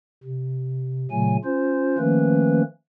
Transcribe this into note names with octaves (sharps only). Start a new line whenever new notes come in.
C3
A#2 C#3 F#3 A3 G#5
C#4 F4 C5
D#3 F3 A3 A#3 C#4 B4